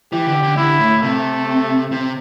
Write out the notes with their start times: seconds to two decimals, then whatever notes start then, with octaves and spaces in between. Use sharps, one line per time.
0.13 E3 G4
0.27 D3
0.43 D3
0.57 D3 E4
0.79 A2
1.03 C3 A3
1.92 C3